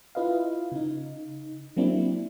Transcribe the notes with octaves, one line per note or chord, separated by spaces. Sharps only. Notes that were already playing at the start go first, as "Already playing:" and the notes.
E4 F4 B4 D#5 F5
C#3 D#4
F#3 A#3 C4 D4 E4